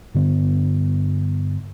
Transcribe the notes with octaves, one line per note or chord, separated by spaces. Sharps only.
G2 D3 B3